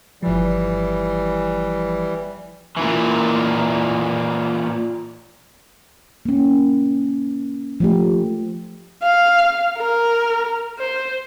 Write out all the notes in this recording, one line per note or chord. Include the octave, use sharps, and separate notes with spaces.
G1 E3 F3 G3
A#2 E3
A#3 C#4
F3 A3 G4
F5
A#4
C5